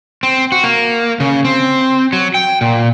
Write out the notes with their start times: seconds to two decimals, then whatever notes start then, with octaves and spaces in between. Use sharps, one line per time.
0.23 C4
0.52 F#4
0.64 A#3
1.20 C#3
1.45 C4
2.13 F#3
2.34 G5
2.61 A#2